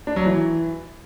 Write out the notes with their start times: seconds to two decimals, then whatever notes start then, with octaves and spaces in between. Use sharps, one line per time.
0.07 D4
0.16 F#3
0.26 E3